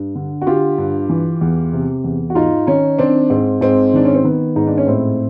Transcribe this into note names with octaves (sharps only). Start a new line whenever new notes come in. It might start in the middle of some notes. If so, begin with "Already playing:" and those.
Already playing: G2
D3
F#4
D3 F4 G4
G2
E3
E2
C3
E2
F#4
G#2 D#4 F4
D#3 C#4 D#4
D#3 C4 D4
G#2 C4
G#2 C4
D#3 D4
C#4
C4
D#3 B3
G#2 D#4
D4
C#4
A2 C4